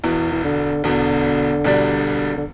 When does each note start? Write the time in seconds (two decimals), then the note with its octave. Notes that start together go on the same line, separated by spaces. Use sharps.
0.04 E1 E2 B2 E3
0.32 E3
0.44 D3
0.84 E1 E2 B2 D3
1.64 E1 E2 B2 G3 D4
2.37 D3